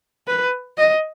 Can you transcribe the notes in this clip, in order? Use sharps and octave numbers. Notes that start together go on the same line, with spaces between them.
B4
D#5